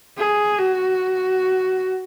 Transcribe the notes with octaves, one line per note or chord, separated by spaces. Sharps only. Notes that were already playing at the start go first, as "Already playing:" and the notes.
G#4
F#4